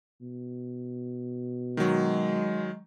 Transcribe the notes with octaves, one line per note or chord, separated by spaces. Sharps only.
B2
D#3 F#3 G#3